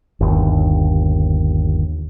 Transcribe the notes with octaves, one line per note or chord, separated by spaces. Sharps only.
G1 D#2